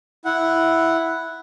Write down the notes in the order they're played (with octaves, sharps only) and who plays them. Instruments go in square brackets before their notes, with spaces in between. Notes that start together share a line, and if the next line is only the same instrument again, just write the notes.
[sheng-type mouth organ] E4 F#5